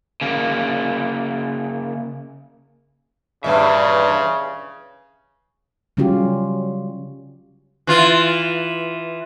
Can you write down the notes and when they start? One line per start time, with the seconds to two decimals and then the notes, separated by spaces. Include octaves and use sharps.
0.21 C#3 A#3
3.44 G2 A#2 C#3 B4 E5
5.97 C#3 F#3 G3 C#4 F4 G4
7.87 E3 F4